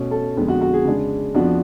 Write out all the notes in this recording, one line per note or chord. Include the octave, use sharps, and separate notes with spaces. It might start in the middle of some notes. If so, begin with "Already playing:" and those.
Already playing: B2 A3 C#4
A4
F2 D3 G#3 B3
F#4
F#4
G#4
C#3 G#3 D4
F2 F3 B3 D4 F#4